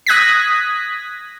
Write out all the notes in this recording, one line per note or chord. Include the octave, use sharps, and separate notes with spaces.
D#6 F#6 G#6 A#6 B6